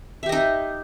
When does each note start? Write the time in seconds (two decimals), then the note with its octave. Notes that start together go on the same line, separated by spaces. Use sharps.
0.23 E5
0.26 G4
0.29 D#5
0.32 D#4